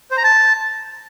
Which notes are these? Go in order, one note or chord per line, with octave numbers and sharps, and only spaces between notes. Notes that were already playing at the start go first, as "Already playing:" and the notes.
C5
A#5
A5